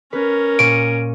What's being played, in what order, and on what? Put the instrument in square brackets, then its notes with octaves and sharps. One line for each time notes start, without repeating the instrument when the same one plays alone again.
[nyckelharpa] C#4 A#4 [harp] B4
[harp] A#2 C#6 D#7 [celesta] D7